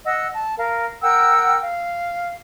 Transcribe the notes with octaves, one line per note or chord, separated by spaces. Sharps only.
D#5 F#5 E6
A5
A#4 F5
A#4 F#5 G5 E6
F5